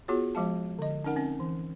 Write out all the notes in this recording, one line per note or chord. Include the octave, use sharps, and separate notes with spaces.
B3 F4 F#4 G#4 C#5
F3 G#3 F5 A5
D3 D#5
C#4 D#4 A#4 F#5
C4 C#4
E3